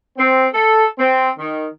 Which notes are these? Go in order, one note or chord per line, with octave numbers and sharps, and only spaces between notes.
C4
A4
C4
D#3